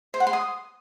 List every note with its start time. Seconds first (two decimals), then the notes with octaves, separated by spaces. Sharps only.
0.14 C5
0.20 F#5
0.27 C6
0.33 D#6